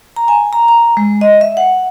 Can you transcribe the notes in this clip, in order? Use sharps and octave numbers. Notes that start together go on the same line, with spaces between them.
A#5
G#5
A#5
A#5
G#3
D#5
E5
F#5